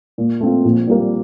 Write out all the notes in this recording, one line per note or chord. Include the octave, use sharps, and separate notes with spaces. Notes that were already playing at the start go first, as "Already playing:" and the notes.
A#2
A3 C4 F4
A#1
A#2 G3 A#3